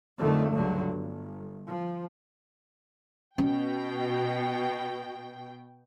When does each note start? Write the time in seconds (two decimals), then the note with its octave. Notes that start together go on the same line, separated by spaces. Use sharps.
0.19 F2 D3 D#3 F#3 A3
0.53 C#2 G2 D3 F#3
0.90 G1
1.67 F3
3.38 B2 C#4 G5